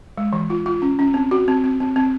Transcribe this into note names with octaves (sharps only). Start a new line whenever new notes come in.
G#3
E3
F4
F4
C#4
C#4
C4
F#4
C4
C4
C4
C4